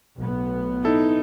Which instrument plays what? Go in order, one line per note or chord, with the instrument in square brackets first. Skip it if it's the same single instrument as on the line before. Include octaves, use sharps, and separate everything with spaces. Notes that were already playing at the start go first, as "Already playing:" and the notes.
[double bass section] B1 A2 B3
[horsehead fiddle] D#4 [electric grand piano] E4 A4